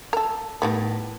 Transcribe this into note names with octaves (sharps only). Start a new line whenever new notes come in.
A4 A#4
A2 D#3 G3 B3